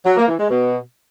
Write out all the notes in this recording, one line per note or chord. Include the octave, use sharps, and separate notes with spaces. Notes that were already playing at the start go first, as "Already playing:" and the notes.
F#3
A#3
E3
G#3
B2